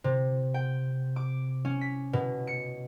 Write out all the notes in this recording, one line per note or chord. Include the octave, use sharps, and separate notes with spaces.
C3
G5
D6
C#4
B6
B2
C#7